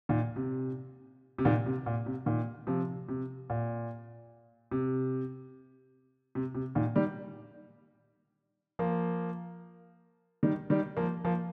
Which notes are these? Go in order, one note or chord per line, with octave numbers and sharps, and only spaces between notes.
A#2 D#3
C3
C3
A#2 D#3
C3
A#2
C3
A#2 D#3
C3 F3
C3
A#2
C3
C3
C3
A#2 D#3
D#3 G3
F3 A#3
D#3 G3
D#3 G3
F3 A#3
F3 A#3